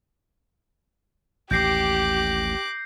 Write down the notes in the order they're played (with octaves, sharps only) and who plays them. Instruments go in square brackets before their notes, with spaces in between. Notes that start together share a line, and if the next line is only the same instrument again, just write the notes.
[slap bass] A1 D#2 [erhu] G4 [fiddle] D6 F#6 [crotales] G6 A#6 C7